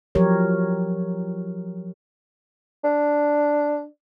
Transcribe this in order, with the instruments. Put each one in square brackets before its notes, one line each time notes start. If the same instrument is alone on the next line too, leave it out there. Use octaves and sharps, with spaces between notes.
[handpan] F3 F#3 G4 A#4 C#5
[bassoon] D4